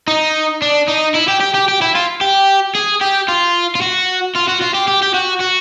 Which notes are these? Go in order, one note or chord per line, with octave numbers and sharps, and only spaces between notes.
D#4
D4
D#4
E4
G4
G4
G4
G4
E4
F4
G4
G#4
G4
F4
F4
F#4
F4
F#4
F4
G4
G4
G4
F#4
F#4